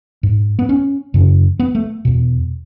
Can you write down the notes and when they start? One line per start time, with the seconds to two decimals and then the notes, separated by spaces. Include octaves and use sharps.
0.23 G#2
0.59 B3
0.69 C#4
1.14 F#2 C#3
1.60 B3
1.75 A3
2.05 E2 B2